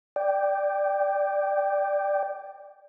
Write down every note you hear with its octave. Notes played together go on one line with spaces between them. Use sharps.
D5 G5